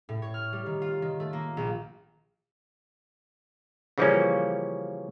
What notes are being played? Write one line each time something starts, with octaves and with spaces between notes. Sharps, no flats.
A2
C#5
F6
G3
D#3
F4
D#3
A3
A#3
A#1
C#3 E3 F3 G3 A#3 C#4